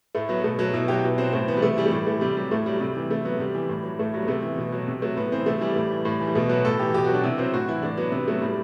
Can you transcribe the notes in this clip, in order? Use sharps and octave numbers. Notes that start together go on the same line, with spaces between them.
A2 A3
F#3 B3
B2 A3
F#3 A3
B2 E4
F#3 G4
B2 E4
F#3 C4
A2 C4
E3 B3
G3
C3 A3
E3 G3
A3
A2 G3
E3 A3
C3 G3
F#3 G3
A2 A3
F#3 G3
C3 G3
E3
C3 A3
F#3 B3
C3 G3
E3
A2
F#3
A2 A3
F#3 G3
B3
C3 A3
E3
B2
F#3
C3
F#3 A3
A2 B3
E3 C4
C3 A3
E3 G3
A2
E3
A2
E3
G3
B2 A3
F#3 B3
A2 A4
E3 G4
B2 G4
F#4
F#3
D4
C3 E4
F#3 C4
A2 F#4
E3 E4
A2 D4
F#3 B3
C3 B3
F#3 A3
A2 G3